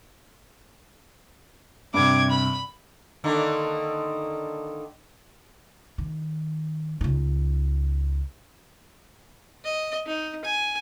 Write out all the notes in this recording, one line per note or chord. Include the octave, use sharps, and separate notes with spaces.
G2 C3 D6 G#6
B5
D3 D#3 A#3
D#3
C#2 D#4
D#5
D#4
G#5